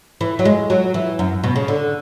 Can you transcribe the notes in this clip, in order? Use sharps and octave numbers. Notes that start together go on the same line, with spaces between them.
E3
F#3
G#3
F#3
E3
F#2
B2
C#3
D3